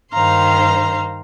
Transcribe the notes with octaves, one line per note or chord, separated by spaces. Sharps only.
G2 D#3 C5 F5 A#5 C6